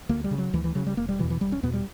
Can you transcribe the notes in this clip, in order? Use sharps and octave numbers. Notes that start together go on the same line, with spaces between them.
D2 A#3
G3
C#3
F#3
D2 E3
E3
C#3 F#3
G3
E1 A#3
G3
E2 B2 E3
E3
E1 G3
C#4
E2 B2 B3
G3